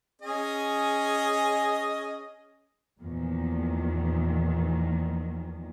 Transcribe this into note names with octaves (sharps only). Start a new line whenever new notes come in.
C#4 G#4 D#5
E2 A#2 D#3 F3